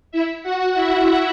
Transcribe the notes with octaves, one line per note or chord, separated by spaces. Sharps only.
E4 E5
F#4 F#5
E4 E5